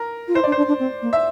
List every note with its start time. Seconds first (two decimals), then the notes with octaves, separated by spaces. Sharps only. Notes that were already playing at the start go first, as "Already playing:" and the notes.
Already playing: A#4
0.28 F4
0.35 E4 C5
0.43 D4 D5
0.52 C5
0.57 D4
0.68 D4
0.80 C4
1.02 A#3
1.13 E5